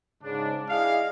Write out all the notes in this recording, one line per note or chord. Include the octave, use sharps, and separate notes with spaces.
G#2 C#3 D4
E4 G#4 D5 D#5 F5